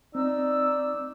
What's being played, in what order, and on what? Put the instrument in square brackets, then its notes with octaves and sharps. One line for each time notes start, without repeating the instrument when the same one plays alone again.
[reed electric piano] C4 [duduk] D#4 [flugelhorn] D5 [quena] E6